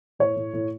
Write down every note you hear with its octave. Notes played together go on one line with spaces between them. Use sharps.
A2 C#5
A2
A2